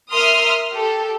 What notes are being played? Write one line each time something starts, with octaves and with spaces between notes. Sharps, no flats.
A#4 E5 C6 D#6 F6
G4 A4